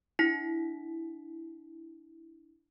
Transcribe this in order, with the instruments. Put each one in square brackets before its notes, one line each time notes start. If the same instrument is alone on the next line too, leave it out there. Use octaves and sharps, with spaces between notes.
[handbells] D4 E4 B6